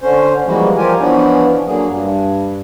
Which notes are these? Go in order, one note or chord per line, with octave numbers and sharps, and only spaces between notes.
D3 C#4 C5
E3 F3 G3 G#3 A#3 F#4
F3 F4 G4 A#4 G#5
E3 F3 B3 C#4 D4
D3 F#3 A#3 G#4
G2